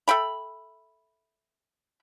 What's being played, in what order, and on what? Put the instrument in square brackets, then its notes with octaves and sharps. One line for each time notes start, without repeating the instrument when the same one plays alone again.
[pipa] A4 E5 G5 B5